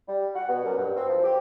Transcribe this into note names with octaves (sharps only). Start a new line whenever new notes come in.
G3
F#5
B2
F#2
G2
C4
F3
G4